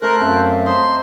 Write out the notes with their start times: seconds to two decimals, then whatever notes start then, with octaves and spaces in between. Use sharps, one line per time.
0.02 A3 A4 A#4 C5 F#6
0.20 F#2 C4 E5 F5
0.66 C5 D#5 E5 A#5 C6